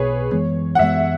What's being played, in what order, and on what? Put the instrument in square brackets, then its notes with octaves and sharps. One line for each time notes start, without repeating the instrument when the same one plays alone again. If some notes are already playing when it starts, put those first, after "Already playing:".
Already playing: [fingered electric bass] B1 B2 B3 [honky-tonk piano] G#4 B4 C#5
[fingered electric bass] F#2 E3 G#3 B3
[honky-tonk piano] F#5
[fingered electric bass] F#2 E3 G#3 B3 [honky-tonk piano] E5